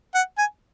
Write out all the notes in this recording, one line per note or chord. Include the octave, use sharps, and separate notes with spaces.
F#5
G#5